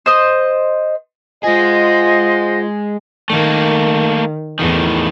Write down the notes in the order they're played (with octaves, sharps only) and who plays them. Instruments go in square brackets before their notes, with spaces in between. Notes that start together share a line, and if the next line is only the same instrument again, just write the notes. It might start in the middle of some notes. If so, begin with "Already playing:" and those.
[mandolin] C5 D#5
[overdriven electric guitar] G#3 G#4 [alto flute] F4 [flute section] C5 D#5 F#5
[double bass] D#3 [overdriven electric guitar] A3 A#3
[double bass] E2 [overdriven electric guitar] A2 D#3